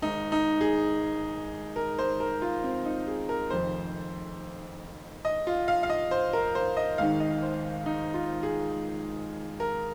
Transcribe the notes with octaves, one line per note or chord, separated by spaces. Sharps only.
G#1 G#2 D#3 D#4
D#4
G#4
A#4
C5
A#4
F4
C4
D#4
G#4
A#4
F1 F2 D#3 C5
D#5
F4
F5
F5
D#5
C5
A#4
C5
D#5
G#1 G#2 D#3 F5
D#5
C5
D#4
F4
G#4
A#4